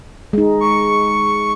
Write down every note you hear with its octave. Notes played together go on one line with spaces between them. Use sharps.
G#3 D#4
C#6